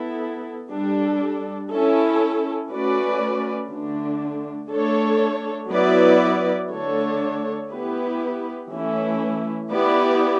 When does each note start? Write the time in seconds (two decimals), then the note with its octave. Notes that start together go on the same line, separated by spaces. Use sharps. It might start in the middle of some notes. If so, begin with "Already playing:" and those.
Already playing: B3 E4 A4
0.70 G3 D4 A4
1.70 C#4 E4 A4
2.70 A3 C#4 F#4 B4 D5
3.70 D3 A3 D4
4.71 A3 D4 A4 C#5
5.70 F#3 B3 E4 B4 D5
6.70 D3 A3 D4 A4 C#5
7.69 B3 E4 G4 B4
8.69 E3 A3 C#4 E4
9.69 B3 E4 G4 B4 D5